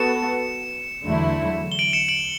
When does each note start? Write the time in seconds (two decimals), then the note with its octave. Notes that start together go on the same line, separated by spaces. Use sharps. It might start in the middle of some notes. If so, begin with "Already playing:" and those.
Already playing: B3 F#4 A4 C#7 E7
1.04 E2 D3 F#3 A3 E4
1.72 G7
1.79 D7 F#7
1.93 C#7 E7
2.08 D7 F#7